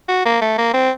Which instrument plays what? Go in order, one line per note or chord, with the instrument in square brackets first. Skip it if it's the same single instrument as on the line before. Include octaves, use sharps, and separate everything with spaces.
[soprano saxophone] F#4
A#3
A3
A#3
C4